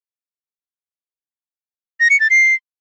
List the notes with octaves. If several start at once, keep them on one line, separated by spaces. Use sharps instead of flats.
A#6
C#7
A6
C7